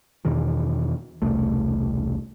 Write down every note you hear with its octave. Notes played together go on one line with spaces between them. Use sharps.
E2 B2 D#3 E3
E1 C2 A3